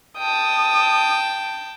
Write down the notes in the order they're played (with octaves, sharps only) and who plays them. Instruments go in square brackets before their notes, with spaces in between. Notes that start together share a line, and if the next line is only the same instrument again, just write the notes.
[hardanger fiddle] G5 A5 [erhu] D#6